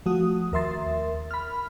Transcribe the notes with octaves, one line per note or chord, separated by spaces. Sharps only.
F3 A3 F#4 D#6
D#2 A#4 E5 C6 A6
B5 F6